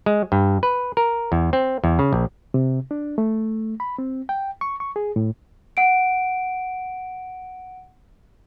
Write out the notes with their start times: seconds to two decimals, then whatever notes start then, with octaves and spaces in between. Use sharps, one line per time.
0.06 G#3
0.32 G2
0.63 B4
0.97 A#4
1.32 E2
1.53 C4
1.84 E2
1.99 C#3
2.13 A#1
2.54 C3
2.91 D4
3.18 A3
3.80 B5
3.98 C4
4.29 G5
4.61 C#6
4.80 C#6
4.96 G#4
5.16 A2
5.77 F#5 D7